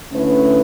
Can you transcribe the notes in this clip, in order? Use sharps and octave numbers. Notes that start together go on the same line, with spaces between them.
D3 A3 C#4 E4 B4